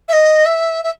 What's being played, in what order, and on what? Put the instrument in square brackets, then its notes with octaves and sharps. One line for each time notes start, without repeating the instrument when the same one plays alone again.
[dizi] E5
D#5
E5
E5